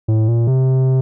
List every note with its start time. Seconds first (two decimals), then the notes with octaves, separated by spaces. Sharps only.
0.08 A2
0.28 A#2
0.47 C3